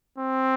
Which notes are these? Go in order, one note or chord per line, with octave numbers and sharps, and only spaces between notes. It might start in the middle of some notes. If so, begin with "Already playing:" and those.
C4